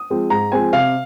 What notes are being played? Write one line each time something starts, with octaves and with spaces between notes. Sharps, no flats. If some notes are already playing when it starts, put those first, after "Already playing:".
Already playing: D#6
F3 G#3 C4
G#2 A#5
F3 G#3 C4 G#5
C3 F5